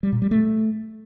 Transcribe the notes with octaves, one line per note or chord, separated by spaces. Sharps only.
G3
A#2
G3
A3